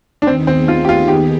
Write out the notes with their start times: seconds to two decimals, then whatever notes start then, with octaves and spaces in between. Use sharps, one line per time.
0.22 D4
0.27 D#2 D#3 B3 C4 D#4 G#4
0.47 C4
0.68 F4
0.85 G4
0.89 F4
1.08 G4